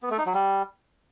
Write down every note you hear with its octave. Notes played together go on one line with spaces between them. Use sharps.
B3
A3
D#4
F#3
G3